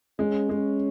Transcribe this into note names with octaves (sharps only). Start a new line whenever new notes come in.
G#3 C#4
G#3